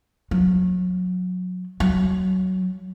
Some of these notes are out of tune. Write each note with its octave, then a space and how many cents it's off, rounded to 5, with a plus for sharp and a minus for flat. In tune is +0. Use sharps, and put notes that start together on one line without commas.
F#3 -25
F#3 +15